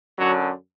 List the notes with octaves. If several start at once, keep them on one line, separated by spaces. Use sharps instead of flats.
F#2 D3 F#3